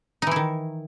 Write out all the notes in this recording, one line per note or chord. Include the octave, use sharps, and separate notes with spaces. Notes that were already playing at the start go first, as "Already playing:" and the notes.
D#3 E3 D#4 E4